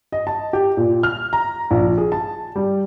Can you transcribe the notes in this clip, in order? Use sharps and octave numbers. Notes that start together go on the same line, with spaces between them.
D#5
A5
G4
A#2
F6
A#5
A#1
G#4
A5
G3